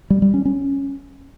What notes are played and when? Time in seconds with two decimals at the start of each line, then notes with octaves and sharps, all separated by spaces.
0.10 G3
0.22 G3
0.34 C#4
0.45 C#4